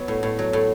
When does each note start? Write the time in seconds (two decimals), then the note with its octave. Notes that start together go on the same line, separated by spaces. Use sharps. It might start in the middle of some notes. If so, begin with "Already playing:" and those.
Already playing: F#3 B3
0.08 A2
0.23 A2
0.39 F#3
0.53 A2